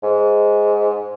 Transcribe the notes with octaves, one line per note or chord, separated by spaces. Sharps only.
G#2